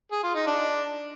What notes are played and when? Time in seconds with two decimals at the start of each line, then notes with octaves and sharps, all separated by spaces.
0.12 G#4
0.24 F4
0.35 D#4
0.47 D4